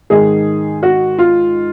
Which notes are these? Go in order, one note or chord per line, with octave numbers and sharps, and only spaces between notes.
G#2 D#3 G#4
F#4
F4